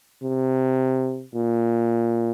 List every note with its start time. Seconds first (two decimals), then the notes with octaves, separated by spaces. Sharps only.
0.24 C3
1.35 A#2